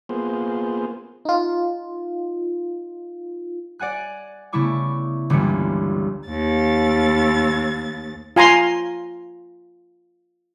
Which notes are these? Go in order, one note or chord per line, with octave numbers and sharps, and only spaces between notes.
A#3 B3 F4 G#4 C5
D#4 F4
D5 F#5 G#5 F#6
C#3 A3 B3 E4 C#6 D6
G1 C#2 G2 E3 A#3 C#7
D#2 A6
F4 G#5 A#5 C6